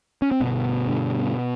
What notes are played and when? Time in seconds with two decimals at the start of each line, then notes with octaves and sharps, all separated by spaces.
0.22 C#4
0.31 C4
0.41 G1 B2 B3
0.87 G2 D3